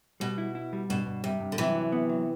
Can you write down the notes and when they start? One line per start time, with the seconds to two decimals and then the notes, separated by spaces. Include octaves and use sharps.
0.20 B2 G3
0.38 E4
0.55 E4
0.73 G3
0.90 G2 B2
1.06 G2
1.24 C3 G3
1.41 G2
1.52 D3
1.58 C3 E3 F#3
1.75 F#3
1.92 B3
2.09 F#3